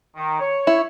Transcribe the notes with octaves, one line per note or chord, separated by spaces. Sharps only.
D#3
C#5
E4